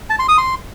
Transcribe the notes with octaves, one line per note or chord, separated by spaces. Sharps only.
A5
C6
D#6
C6